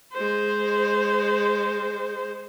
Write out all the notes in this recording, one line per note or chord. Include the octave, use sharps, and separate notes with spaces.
G#3 C5